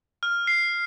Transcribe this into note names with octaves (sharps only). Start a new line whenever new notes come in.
F6
C7